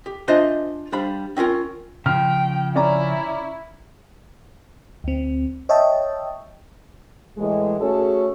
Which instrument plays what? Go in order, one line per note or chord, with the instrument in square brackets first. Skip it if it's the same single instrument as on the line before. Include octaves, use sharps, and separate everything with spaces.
[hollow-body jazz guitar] G4
D4 F4 C5 D#5 E5 G#5
G3 D4 C5 F5 B5
C4 C#4 F4 A#4
[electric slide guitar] C#3 F3 [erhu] G5 [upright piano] F6
[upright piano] C#4 D5 A#5 [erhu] E4
[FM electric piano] D2 C4
C#5 D#5 E5 G5 A5
[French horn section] A2 E3 G#3
A3 C#4 F#4 G#4 A4